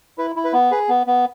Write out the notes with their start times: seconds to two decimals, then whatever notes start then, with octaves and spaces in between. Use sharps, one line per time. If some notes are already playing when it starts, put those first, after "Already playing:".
0.18 E4 B4
0.36 E4
0.45 B4
0.53 B3
0.71 G#4 B4
0.89 B3
1.07 B3